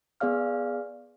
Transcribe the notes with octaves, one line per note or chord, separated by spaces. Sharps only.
B3 G#4 D5 F5 F6